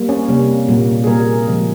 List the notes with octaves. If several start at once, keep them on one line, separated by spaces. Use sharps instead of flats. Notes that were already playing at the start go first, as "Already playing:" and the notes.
Already playing: G3 A#3
C#4
C3 G3 A#3
A#2 G3 A#3
G#4
A#2 G3 A#3 A#4
C#3 F3 G#3